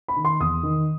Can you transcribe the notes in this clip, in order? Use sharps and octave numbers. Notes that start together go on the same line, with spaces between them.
B5
D#3
C6
E2 D#6
D#3